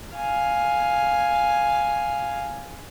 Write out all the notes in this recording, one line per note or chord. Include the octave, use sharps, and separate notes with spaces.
F5 G#5